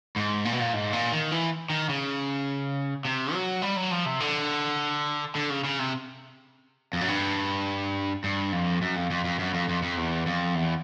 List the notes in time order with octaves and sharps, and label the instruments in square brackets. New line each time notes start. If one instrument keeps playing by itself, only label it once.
[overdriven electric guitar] G#2
A#2
B2
A#2
G#2
A#2
D#3
E3
D#3
C#3
C3
F#3
G3
F#3
F3
C3
D3
D3
C#3
C#3
C3
F2
F#2
G2
G2
F2
F#2
F2
F2
F2
F#2
F2
F2
F2
E2
F2
E2